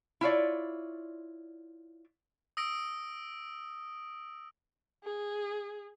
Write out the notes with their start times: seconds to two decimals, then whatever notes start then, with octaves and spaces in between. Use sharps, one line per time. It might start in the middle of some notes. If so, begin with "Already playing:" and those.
0.21 E4 F4 C#5 D5
2.57 D#6 E6 A#6 D7
5.04 G#4